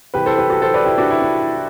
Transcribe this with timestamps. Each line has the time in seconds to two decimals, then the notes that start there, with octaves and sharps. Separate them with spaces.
0.14 C2 C3 E3 G4 B4
0.26 A4 C5
0.38 G4 B4
0.50 F#4 A4
0.62 A4 C5
0.74 B4 D5
0.85 E4 G4
0.98 D4 F#4
1.10 E4
1.22 D4